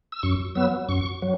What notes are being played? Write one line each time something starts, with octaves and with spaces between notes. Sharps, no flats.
E6
F#2 C#6
F#3 B3 E6
F#2 C#6
F#3